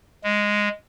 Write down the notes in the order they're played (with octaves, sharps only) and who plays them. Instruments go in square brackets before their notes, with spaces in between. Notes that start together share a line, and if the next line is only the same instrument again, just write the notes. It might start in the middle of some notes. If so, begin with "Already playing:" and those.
[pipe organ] G#3